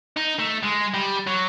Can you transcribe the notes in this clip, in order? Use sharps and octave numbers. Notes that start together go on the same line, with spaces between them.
D#4
A3
G#3
G3
F#3